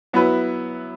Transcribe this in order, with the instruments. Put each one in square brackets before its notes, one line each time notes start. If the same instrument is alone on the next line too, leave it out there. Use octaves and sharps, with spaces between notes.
[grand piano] F#3 B3 E4 B4